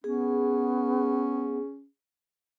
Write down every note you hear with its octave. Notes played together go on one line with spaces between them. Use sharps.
B3 C#4 G#4